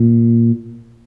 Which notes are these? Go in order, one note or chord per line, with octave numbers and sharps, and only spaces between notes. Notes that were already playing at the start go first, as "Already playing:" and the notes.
Already playing: A#2